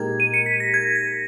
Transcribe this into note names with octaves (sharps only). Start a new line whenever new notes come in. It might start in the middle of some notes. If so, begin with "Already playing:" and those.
Already playing: A#2 G#3 D#4 G4 A#4 G#6
D#7
C#7
B6
A#6
G#6
A#6